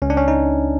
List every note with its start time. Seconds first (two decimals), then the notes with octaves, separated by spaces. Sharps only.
0.02 C#2 C#4
0.10 D4
0.17 C#4
0.28 D#4